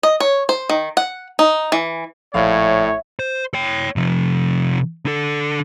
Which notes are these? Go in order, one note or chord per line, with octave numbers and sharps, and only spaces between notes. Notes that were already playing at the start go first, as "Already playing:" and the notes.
D#5
C#5
C5
D#3
F#5
D#4
E3
A#1 A2 C#5 E5 F5
C5
C#5 G5
C3 F3
D3 A4